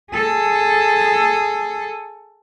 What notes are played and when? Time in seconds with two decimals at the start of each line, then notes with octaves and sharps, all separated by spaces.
0.13 G#4 A4